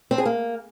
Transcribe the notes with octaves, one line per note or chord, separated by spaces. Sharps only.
C4
G#4
A#3